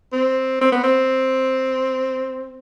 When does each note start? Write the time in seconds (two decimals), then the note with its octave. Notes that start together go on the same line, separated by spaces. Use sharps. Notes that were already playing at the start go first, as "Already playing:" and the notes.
0.13 C4
0.61 C4
0.72 B3
0.84 C4